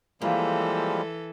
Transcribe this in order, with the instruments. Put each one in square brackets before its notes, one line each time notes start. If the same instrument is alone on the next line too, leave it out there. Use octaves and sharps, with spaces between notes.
[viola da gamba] E3 A4 [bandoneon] F3 G3 G#3 [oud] A#3